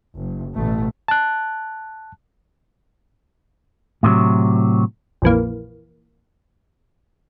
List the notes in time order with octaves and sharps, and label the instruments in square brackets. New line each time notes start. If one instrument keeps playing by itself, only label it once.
[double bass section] F#1
A1 B2 A3
[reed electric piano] A5 F#6
[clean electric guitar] A2 C3 D#3 F#3
[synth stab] A#1 F2 E3 A#3